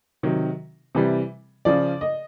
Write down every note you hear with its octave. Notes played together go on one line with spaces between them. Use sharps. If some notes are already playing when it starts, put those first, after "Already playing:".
C3 D#3 F#3
C3 E3 G3
C#3 F3 D5
D#5